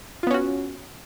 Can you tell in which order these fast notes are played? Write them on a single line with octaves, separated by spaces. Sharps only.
F4 B3 C#4 F#4